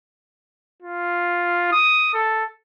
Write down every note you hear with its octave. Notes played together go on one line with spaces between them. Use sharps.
F4
D#6
A4